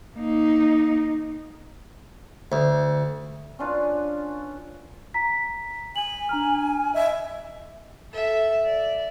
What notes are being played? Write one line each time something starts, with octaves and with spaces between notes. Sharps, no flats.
A#3 D#4
D2
C#4 D4 F4 B4
A#5 B6
G#5 F#7
D4 A#5 F6
D#5 E5
A4 E5
D5